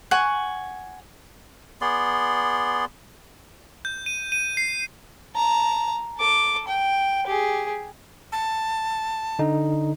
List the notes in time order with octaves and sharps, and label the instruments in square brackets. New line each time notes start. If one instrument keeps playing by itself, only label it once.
[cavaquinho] F#5 G#5 C#6
[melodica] B3 G#4 D5 C6
[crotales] G6
D#7
D#7
C7
[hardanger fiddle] A5 A#5
A4 D6
G5
G4 G#4
[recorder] A5
[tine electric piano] D3 D#4